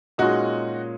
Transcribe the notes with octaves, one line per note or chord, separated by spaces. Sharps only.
A#2 G#3 C#4 D#4 F#4 G#4